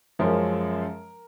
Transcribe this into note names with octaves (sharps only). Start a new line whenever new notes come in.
F#2 F3 G#3 C#4 A#4